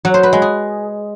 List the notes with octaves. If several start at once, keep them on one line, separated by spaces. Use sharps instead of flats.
F#3
C5
B4
G#3
G#4